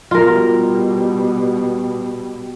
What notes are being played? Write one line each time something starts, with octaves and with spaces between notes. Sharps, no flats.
B2 G3 F4 A#4